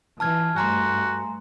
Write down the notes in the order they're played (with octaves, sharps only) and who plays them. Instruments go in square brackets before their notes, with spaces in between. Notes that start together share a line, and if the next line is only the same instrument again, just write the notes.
[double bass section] E3 [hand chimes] A5 F6 G#6
[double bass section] G2 A3 [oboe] F#4 [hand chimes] G#5 A#5 C6